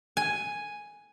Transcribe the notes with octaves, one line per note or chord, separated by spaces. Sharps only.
G#5